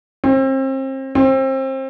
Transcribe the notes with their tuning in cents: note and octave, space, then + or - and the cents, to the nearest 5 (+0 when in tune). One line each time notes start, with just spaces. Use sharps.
C4 +35
C4 +30